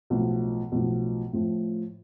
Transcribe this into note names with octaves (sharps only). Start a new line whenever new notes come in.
B1 A2 F3
B1 A2 F3
A2 F3